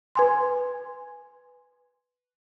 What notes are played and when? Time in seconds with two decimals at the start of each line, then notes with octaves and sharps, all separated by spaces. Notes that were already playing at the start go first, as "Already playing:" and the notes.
0.15 B4 G#5 C6